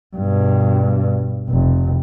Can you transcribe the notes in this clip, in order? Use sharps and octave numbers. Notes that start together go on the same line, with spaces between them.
G2 B2
F1